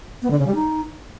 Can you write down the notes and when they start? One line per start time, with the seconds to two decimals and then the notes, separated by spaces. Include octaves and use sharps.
0.22 B3
0.31 D3
0.39 C#3
0.47 G3
0.55 D#4